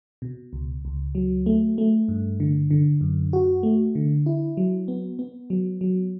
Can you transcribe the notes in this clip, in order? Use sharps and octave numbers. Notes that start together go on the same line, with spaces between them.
B2
C#2
C#2
F#3
A3
A3
G2
D3
D3
F#2
F#4
A3
D3
E4
F#3
B3
B3
F#3
F#3